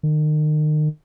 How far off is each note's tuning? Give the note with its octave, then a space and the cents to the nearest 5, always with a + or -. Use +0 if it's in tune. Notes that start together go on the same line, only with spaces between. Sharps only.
D#3 -35